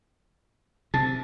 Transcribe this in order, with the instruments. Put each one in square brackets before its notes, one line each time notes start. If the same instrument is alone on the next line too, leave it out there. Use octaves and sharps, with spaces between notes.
[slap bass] C3 [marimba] A5 [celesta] A6